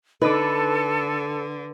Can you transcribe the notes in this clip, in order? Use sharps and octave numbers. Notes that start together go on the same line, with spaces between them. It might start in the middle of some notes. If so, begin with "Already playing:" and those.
D3 D#4 A4 B4 D6